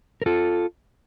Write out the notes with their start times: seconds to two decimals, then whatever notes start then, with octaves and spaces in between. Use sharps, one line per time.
0.22 A#4
0.26 F4 A4